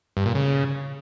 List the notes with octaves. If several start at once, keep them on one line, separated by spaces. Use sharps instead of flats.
G2
A#2
C#3